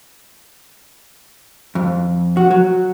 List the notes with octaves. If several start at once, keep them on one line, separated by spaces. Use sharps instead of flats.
F2
F#4
F#3